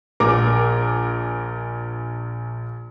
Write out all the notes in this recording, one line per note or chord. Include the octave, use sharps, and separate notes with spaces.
A#1 A#4 A#5 D6